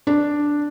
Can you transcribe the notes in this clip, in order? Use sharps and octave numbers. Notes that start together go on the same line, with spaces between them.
D4